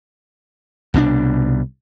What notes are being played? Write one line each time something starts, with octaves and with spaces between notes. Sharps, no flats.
C2 B2 G3 D4